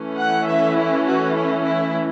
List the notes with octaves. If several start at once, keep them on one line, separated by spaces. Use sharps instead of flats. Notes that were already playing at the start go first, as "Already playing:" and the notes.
Already playing: E3 A3 C#4
F#5
E5
E4
F#4
E4
E4